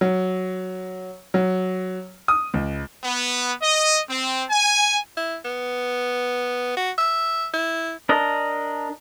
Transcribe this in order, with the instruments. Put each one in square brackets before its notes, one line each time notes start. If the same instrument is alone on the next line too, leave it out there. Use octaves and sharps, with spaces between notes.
[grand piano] F#3
F#3
D#6
C#2
[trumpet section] B3
D#5
C4
G#5
[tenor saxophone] E4
B3
F#4
E5
E4
[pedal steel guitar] D4 A#4 D#5